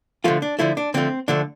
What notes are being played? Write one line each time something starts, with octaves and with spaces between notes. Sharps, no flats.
D3 F3 A3 F4
D4
D3 F3 A3 E4
D4
D3 F3 A3 C4
D3 F3 A3 D4